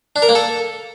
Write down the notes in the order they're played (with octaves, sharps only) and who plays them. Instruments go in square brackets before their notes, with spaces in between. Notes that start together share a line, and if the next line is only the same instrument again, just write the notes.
[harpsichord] D4
A#4
A#3
A4